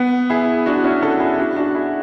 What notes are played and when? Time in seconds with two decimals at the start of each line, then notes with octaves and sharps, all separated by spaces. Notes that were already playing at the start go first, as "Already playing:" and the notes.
Already playing: B3
0.30 E4 G#4
0.66 D4 F#4
0.84 C#4 E4
1.02 F#4 A4
1.20 E4 G#4
1.38 D4 F#4
1.56 D4 F#4
1.75 E4 G#4